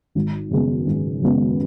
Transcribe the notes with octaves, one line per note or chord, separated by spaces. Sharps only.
G#1
F#2 C#3 G#3 B3
G#1
F#2 C#3 G#3 B3